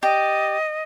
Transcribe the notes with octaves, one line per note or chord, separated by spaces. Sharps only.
G4 D5 D#5